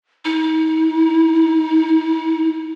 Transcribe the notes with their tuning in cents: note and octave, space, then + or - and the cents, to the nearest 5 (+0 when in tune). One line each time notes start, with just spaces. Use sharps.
D#4 +40